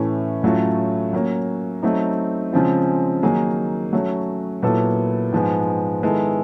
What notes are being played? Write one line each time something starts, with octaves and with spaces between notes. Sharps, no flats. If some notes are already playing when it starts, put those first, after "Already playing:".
Already playing: A2 E3 A3 C#4
A2 F#3 A3 C#4 F4
F#3 A#3 C#4
F#3 A3 C4 D#4
C#3 F3 G#3 C4 F4
D#3 F#3 A#3 D#4 G#4
F#3 A3 C#4
A#2 F#3 B3 E4 A4
G#2 F3 G#3 B3
D#3 G#3 B3 E4 A4